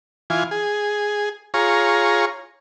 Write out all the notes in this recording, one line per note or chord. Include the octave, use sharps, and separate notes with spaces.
E3 F4 G#5
G#4
F4 G#4 C#5 A#5